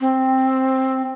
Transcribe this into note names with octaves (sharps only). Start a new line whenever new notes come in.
C4